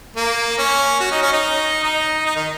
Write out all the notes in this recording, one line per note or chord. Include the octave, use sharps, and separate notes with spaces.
A#3
C#4
F#4
D#4
C#4
D#4
D#4
D#4
D#3